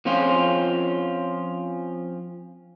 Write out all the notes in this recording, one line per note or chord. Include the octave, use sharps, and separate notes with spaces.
F3 C4 C#4 F4